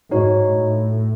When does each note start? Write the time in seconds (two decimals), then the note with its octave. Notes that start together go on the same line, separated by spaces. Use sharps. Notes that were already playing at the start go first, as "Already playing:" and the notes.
0.11 G#2 D#4 F#4 C#5
0.51 A2